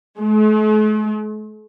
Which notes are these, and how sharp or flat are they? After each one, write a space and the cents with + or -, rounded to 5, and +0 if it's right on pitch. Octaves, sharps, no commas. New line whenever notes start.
A3 -45